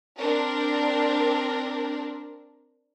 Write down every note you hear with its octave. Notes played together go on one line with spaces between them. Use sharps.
C4 D4 A#4